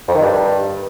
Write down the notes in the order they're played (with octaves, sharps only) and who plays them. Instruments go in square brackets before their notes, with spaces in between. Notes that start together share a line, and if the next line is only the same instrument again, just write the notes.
[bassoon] F2
D#3
G2